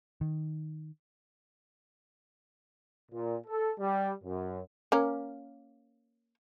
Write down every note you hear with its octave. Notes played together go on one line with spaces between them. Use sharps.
D#3
A#2
A4
G3
F#2
A#3 C#4 A#4